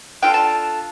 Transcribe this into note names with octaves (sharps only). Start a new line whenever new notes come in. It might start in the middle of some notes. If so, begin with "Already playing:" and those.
D4 F4 A4 G5
A5